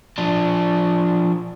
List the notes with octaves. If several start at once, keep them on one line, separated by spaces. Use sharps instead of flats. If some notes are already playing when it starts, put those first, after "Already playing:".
F3 D4